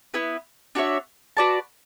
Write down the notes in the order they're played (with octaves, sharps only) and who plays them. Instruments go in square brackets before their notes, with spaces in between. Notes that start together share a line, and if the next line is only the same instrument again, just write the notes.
[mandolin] B3 E4 B4
D4 F#4 C#5 E5
F#4 B4 D5 A5